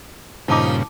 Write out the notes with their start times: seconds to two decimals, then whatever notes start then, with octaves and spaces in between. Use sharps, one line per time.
0.48 G2 A#2 C#3 F3 D#4 E4 A5 D6